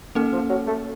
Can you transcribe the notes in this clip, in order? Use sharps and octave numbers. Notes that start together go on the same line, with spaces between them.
D#3 A#3 C#4 A4
F3
F#3
A3